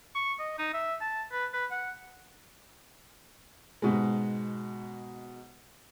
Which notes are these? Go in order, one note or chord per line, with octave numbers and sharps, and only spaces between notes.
C#6
D#5
D#4
E5
A5
B4
B4
F#5
G#2 B2 G#3